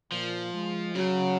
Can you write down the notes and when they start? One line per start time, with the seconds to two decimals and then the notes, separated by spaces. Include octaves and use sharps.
0.12 A#2 F3
0.54 G#3
0.95 C#3 F#3